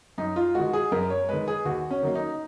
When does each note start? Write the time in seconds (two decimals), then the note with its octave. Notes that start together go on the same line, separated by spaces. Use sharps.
0.18 F#2 D#4
0.36 F4
0.55 D#3 G#3 F#4
0.73 G#4
0.92 F#2 A#4
1.10 C#5
1.29 D#3 G#3 B4
1.48 G#4
1.65 D#2 F#4
1.91 C#4
2.02 D#3 F#3 A#3
2.15 D#4